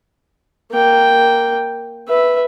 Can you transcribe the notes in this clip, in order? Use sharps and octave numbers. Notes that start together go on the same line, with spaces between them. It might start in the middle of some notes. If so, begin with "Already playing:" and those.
A#3 G5
B4 E5